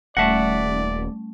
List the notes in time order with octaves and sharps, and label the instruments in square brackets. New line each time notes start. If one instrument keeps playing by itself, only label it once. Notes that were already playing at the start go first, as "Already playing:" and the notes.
[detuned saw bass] D#1 [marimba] G3 A3 C#4 [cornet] D5 [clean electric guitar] E5 F#5